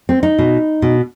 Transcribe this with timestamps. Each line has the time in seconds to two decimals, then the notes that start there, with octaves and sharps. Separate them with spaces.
0.09 C4
0.23 D#4
0.39 B2
0.82 B2